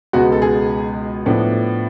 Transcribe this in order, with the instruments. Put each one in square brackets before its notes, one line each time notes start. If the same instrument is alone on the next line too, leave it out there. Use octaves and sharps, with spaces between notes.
[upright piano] C#2 B2 G#3 B3 F#4
A4
G#4
A2 F3 B3 D4